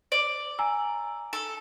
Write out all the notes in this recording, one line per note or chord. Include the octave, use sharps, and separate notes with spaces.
D5
G#5 A#5 E6
A4